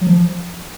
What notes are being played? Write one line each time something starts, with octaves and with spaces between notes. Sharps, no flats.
F#3
F3